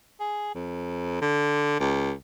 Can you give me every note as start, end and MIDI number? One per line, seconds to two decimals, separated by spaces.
0.20 0.51 68
0.54 1.19 41
1.21 1.77 50
1.80 2.13 37